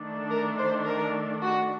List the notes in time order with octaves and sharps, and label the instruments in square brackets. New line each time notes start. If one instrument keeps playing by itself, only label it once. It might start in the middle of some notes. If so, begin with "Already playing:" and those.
Already playing: [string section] D#3 A3 D4
A#4
C5
A#4
F#4